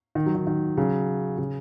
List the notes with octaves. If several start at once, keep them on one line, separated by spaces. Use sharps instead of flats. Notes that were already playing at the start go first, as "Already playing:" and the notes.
D#3
F#3
D#3
D#3
C#3 F#3
C#3